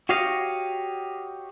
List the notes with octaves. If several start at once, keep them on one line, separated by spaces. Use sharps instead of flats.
F#4 G4 C#5 D#5 F5